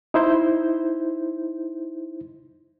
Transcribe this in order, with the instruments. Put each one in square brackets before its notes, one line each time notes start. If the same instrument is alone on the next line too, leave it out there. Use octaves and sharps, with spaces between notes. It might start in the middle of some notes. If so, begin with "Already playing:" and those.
[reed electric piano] D#4 E4 C5 G6